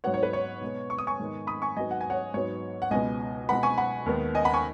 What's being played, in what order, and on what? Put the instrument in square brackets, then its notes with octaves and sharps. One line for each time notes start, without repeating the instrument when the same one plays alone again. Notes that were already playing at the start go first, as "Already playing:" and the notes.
[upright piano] G#2 F#3 B3 C#5 F#5
C#5
B4
C#5
B2 G#3 B3
C#6
D#6
G#5 C#6
G#2 D#3 G#3 B3
B5 D#6
G#5 C#6
G#2 F#3 B3 D#5 G#5
F#5
G#5
C#5 F#5
G#2 F#3 B3 C#5
F#5
C#2 B2 G#3 B3 D#5 G#5
B2 G#3 B3 F#5 B5
G#5 C#6
F#5 B5
D#2 D#3 G#3 B3
D#5 G#5
F#5 B5
G#5 C#6